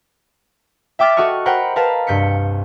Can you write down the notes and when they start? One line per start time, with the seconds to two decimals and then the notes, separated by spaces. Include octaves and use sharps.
0.99 E5 G5 D6 F6 A6 B6
1.16 F#4 A4 D#5 C#6 F6
1.46 A#4 C5 F#5 G5 B5
1.76 A#4 B4 F5 A5 B5
2.07 C2 G2 G6 B6 C#7